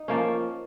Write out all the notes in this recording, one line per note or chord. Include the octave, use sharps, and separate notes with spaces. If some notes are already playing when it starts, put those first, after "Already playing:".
Already playing: D#4
F3 A#3 C#4